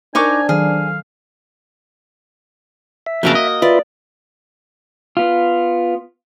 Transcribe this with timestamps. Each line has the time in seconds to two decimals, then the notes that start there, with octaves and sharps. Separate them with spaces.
0.15 D4 D#4 A#4 C5 G#5 C#6 D6
0.49 D#3 F#3 G#4 F5
3.07 E5
3.23 F2 C#3 A#3 F#4 A4 A#4
3.35 D#5
3.62 F4 B4 D5 E5
5.17 B3 F4